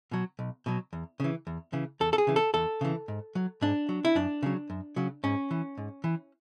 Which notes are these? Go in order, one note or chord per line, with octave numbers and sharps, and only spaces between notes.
B2 F#3
B1
B2 F#3
E2
C#3 E3
E2
C#3 E3
E2 A4
A4
G#4
C#3 E3
A4
E2 A4
C#3 E3
G#2
F#3
G#2 D4
F#3
E4
F#2 D4
C#3 F#3
F#2
C#3 F#3
G#2 C#4
E3
G#2
E3